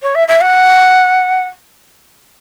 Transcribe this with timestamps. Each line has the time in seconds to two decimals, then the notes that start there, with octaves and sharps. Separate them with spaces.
0.02 C#5
0.15 E5
0.28 E5
0.41 F#5